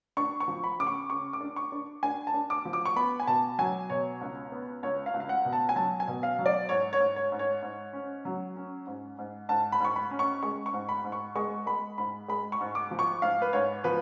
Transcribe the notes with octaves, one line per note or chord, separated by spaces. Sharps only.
D4 C#6
C#6
F3
B5
C#3 D6
C#6
C#3 C#6
D6
D4
C#6
D4
D4 G#5
A5
D4
D6
F3
D6
C#6
B3 B5
G#5
B2 A5
F#3 G#5
B2 C#5
C#2
B3
C#2 C#5
F5
C#2
F5
F#5
B2
A5
G#5
F#3 A5
G#5
B2
F5
F#3
D5
G#2 C#5
C#5
G#2
C#5
G#2
C#5
G#2
C#4
F#3
C#4
G#2
G#2
G#2 A5
B5
G#2 C#6
B5
C#4
C#6
G#3 C#6
C#6
G#2
B5
G#2
C#6
G#3 C#6
G#3 B5
G#2 B5
G#3 B5
C#6
G#2
D6
F3
C#6
G#2 F5
B4
G#2 C#5
F3 B4